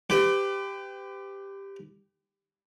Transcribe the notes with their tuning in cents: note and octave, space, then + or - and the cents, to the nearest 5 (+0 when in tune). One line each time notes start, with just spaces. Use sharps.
G4 +5 B4 +45